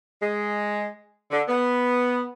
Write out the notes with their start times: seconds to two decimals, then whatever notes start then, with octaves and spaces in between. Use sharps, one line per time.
0.22 G#3
1.31 D3
1.49 B3